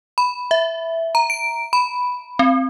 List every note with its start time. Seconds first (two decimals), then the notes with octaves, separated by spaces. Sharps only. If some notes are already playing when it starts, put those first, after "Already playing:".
0.18 B5
0.51 E5
1.15 A#5
1.30 D7
1.73 B5
2.39 C4